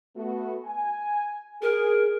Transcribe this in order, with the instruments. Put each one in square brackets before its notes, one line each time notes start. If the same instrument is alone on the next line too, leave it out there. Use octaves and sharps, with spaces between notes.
[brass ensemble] A3 B3 F#4
G#5
[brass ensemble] G#4 [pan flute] A#4